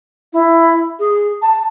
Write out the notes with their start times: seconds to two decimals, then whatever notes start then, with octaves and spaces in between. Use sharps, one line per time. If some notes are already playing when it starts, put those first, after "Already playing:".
0.33 E4
0.99 G#4
1.42 A5